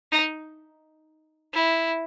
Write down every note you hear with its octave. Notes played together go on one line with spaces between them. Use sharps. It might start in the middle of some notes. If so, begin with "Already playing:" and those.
D#4
E4